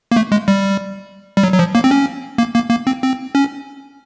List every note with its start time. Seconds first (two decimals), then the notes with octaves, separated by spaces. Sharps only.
0.11 A#3
0.16 A3
0.32 G#3
0.48 G3
1.37 G3
1.43 F#3
1.54 F#3
1.59 F3
1.75 A#3
1.84 C4
1.91 C#4
2.38 A#3
2.55 A#3
2.70 A#3
2.87 C4
3.02 C4
3.35 C#4